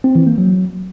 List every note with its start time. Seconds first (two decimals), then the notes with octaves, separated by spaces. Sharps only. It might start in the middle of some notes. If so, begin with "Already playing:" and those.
0.04 C4
0.15 E3
0.27 A#3
0.38 F#3